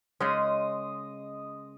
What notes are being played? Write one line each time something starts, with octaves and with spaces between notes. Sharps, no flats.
C#3 G#3 C#4 D#5 C6